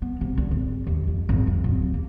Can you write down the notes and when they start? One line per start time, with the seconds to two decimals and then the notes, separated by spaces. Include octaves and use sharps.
0.02 B3
0.21 C3
0.37 D2
0.51 G#1
0.87 D#2
1.07 F2
1.29 G#1
1.47 F2
1.64 D1
1.94 A#3